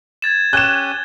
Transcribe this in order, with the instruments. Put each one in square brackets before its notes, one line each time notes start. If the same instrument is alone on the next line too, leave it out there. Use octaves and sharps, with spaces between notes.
[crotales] G#6 A6 E7
[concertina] C#4 G4 G#5 [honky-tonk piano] F#6 E7 [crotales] G7